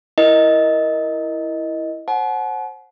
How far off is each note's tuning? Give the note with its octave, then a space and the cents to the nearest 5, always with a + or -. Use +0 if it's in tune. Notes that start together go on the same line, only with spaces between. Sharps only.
E4 +0 A#4 +0 D#5 +5
C5 +20 F#5 +0 A5 -45